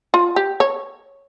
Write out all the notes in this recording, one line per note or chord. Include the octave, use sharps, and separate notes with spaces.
F4
G4
C#5